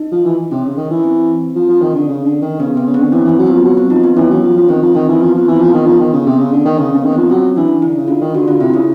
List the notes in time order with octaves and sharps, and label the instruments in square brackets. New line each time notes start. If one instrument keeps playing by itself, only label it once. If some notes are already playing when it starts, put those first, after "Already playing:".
Already playing: [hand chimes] D#4
[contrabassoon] F3
E3
[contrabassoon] C3 [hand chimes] C#4
[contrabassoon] C#3
D#3
E3
[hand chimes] C4
[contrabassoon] F3
F3
D#3
D3
C#3
D3
D#3
[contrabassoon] C#3 [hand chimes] B3
[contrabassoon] C3 [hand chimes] B3
[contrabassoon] C#3
[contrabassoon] D3 [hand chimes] C4
[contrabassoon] E3 [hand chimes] C#4
[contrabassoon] E3
[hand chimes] C4
[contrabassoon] F#3
[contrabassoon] F3 [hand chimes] B3
[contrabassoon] F#3
[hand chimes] C4
[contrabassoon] F3 [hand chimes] D#4
[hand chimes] B3
[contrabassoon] E3 [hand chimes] C#4
[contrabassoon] F#3
F3
F3
[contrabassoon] D#3 [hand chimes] C4
[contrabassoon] F3
[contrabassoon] D#3 [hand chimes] C4
[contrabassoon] E3
[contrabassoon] F3 [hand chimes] B3
[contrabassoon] F3
[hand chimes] C4
[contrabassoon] E3
[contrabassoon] F3 [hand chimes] B3
[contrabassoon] D#3 [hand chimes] B3
[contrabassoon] F3
D#3
C#3
C3
C#3
D3
D#3
[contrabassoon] C#3 [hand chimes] C4
[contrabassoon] C#3 [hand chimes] B3
[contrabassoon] D#3
[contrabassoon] F3 [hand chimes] C4
[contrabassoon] F#3 [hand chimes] C#4
[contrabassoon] E3 [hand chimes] D4
[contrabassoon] D3 [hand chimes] E4
[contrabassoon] C#3
[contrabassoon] D3 [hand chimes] F4
[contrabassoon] D#3
[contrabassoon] D3 [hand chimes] F#4
[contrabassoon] D3 [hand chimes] F4
[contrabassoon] C3 [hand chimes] E4
[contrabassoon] C#3 [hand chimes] E4